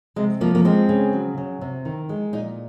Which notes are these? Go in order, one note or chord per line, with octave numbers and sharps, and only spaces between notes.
C3 G#3
F3 A#3
A#3
G#3 C4
C#3
F#3
C#3
C3
D#3
G#3
A#2 D#4